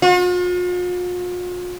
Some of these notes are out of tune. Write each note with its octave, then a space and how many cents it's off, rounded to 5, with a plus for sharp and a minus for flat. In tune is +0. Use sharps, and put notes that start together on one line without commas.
F4 +45